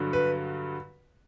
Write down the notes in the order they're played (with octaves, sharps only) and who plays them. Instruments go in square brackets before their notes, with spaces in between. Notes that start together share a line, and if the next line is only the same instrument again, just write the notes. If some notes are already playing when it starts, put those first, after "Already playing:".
Already playing: [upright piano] G2 D3 F#3
B4